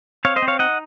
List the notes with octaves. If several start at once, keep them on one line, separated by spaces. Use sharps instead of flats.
C4 C#5 F5
C5 D#5
C4
C#5 F5
D#4 D#5 F#5